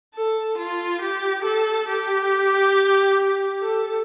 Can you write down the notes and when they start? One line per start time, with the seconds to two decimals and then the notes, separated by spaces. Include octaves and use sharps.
0.15 A4
0.58 F4
1.02 G4
1.44 A4
1.88 G4
3.62 A4